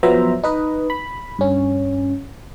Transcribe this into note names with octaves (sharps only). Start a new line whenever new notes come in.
F3 F#3 B3 C5 E5 A#5
D#4 B4 D#5
B5
G2 C#4